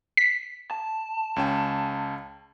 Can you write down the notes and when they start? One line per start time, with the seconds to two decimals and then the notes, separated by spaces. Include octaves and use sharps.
0.17 B6
0.71 A5
1.36 C#2 C#4 G5